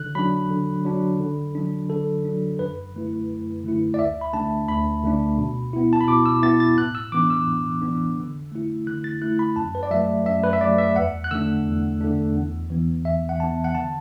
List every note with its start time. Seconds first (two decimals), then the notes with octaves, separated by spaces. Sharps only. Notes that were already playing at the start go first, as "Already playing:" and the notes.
Already playing: D3 F#6
0.15 F#3 D4 B5
0.50 D3
0.85 F#3 D4
1.20 D3
1.55 F#3 D4
1.89 D3 A4
2.25 F#3 D4
2.59 F#2 B4
2.94 D3 A3 E4
3.29 F#2
3.64 D3 A3 E4
3.94 D5
3.99 D2 E5
4.21 B5
4.33 D3 A3 D4 A5
4.68 D2 B5
5.04 D3 A3 D4
5.38 B2
5.73 B3 E4
5.93 A5
6.01 B5
6.08 B2 D6
6.26 E6
6.42 B3 E4 A6
6.60 A6
6.77 A2 F#6
6.95 E6
7.12 E3 B3 D4 D6
7.30 E6
7.47 A2
7.82 E3 B3 D4
8.17 D3
8.52 A3 E4
8.86 D3 F#6
9.04 A6
9.22 A3 E4 F#6
9.39 B5
9.56 F#2 A5
9.75 B4
9.83 D5
9.91 F#3 A3 E5
10.26 F#2 E5
10.44 B4
10.53 E5
10.61 F#3 A3 D5
10.78 E5
10.96 E2 F#5
11.24 F#6
11.31 D3 A3 D4 E6
11.65 E2
12.01 D3 A3 D4
12.35 E2
12.70 E3 B3
13.05 E2 E5
13.29 F#5
13.40 E3 B3 A5
13.64 F#5
13.75 D3 A5